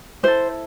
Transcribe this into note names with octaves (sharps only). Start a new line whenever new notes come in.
E4 A4 C5